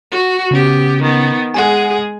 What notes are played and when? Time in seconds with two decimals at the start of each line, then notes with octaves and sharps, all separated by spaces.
0.11 F#4
0.51 C#3 B3 C#4 G4
1.02 D#3 B3
1.54 G#3 G#4 F#5 G#5